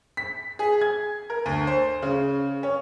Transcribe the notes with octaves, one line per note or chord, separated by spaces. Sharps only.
B6
G#4
G#6
A#4
D2
C5
C#3
C#4